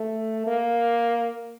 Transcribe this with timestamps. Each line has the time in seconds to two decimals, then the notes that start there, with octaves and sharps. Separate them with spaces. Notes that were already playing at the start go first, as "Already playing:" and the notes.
Already playing: A3
0.47 A#3